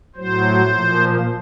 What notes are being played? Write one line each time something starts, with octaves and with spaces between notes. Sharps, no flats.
A2 F#3 C5
A#2 F3